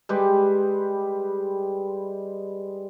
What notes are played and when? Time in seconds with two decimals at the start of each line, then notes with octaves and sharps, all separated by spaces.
0.09 G3 G#3 G4 B4